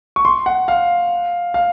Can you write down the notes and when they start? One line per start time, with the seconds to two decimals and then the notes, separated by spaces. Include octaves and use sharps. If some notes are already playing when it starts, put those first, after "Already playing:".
0.16 C#6
0.25 C6
0.46 F#5
0.68 F5
1.54 F5